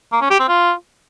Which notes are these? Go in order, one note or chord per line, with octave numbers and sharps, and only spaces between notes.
A#3
C#4
G4
C4
F4